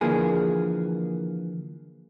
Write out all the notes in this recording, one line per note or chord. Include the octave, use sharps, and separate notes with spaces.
D3 E3 F3 A#3 G#4